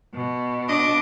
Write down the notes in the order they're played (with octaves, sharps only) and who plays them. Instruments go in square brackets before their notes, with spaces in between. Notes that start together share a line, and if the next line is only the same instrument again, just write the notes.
[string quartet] B2
[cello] D4 [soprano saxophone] D#5 [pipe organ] D6